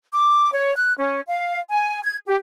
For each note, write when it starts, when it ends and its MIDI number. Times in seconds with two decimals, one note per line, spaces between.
0.13 0.51 86
0.53 0.73 73
0.76 0.93 90
0.98 1.20 61
1.28 1.59 77
1.71 2.01 80
2.03 2.17 92
2.26 2.35 67